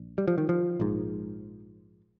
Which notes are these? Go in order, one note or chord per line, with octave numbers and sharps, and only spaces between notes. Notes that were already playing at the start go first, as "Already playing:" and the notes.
Already playing: A#1
G3
F3
D#3
F3
A#1 G#2